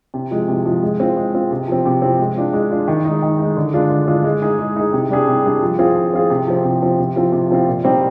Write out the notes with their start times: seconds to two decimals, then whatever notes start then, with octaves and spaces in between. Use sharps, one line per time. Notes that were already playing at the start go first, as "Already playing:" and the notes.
0.14 C3
0.31 F3 G#3
0.48 C3
0.65 F3 G#3
0.83 G#3
1.00 C4 F4
1.17 G#3
1.34 C4 F4
1.51 C3
1.68 F3 C4
1.85 C3
2.02 F3 C4
2.19 G#3
2.37 D4 F4
2.53 G#3
2.71 D4 F4
2.88 D#3
3.05 G#3 D#4
3.22 D#3
3.39 G#3 D#4
3.57 D3
3.74 G#3 D4 F4
3.90 D3
4.08 G#3 D4 F4
4.24 G#3
4.42 D#4 G#4
4.59 G#3
4.76 D#4 G#4
4.93 C3
5.10 G3 D4 G#4
5.28 C3
5.45 G3 D4 G#4
5.62 F3
5.79 C4 F4 G#4
5.96 F3
6.13 C4 F4 G#4
6.30 C3
6.47 F3 C4
6.64 C3
6.82 F3 C4
6.99 C3
7.16 F3 C4 F4
7.32 C3
7.50 F3 C4 F4
7.67 A#2
7.84 G3 C4 D#4